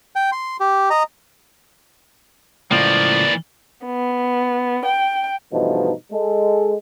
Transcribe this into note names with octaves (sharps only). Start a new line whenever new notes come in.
G5
C6
G4
D#5 A#5
C#2 A2 E3 F3 A#3 D5
B3
G5
G2 B2 E3 F3 A3 D#4
G#3 A4